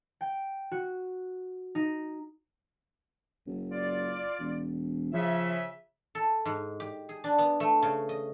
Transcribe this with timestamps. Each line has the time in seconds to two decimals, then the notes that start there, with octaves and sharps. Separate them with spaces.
0.21 G5
0.72 F#4
1.75 D#4
3.46 F#1
3.72 F4 D5
4.39 E1
5.13 C#3 F3 E5
6.15 A4
6.45 G#2
6.80 G4
7.09 G#4
7.24 D4
7.38 B3
7.60 A3
7.82 C#3
8.09 D#5